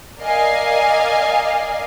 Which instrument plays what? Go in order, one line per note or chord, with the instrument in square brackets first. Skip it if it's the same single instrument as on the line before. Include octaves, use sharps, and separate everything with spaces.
[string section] A#4 D5 D#5 F5 G#5